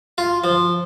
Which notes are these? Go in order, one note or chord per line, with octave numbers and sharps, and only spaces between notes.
F4
F3